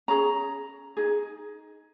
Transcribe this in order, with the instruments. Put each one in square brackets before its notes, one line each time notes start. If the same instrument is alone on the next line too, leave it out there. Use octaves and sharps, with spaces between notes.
[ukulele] C#4 G#4 A#5
D#4 G#4